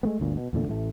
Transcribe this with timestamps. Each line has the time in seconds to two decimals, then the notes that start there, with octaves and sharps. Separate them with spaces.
0.03 G#3 A3 B3
0.20 G1 D2 A#2
0.37 B2
0.53 E2 A#2 D3 A3
0.68 A1 A2 A3